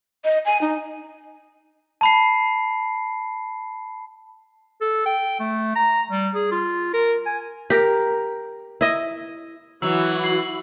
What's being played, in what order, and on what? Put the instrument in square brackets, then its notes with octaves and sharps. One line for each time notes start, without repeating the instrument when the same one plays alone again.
[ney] D#5
G#5
D#4
[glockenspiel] A5 B5 C7
[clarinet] A4
G5
A3
A#5
G3
G#4
F4
A#4
G#5
[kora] G4 A#4
E4 D#5
[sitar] E3 F#3 [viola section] E4 F#4 [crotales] E6
[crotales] C7 F#7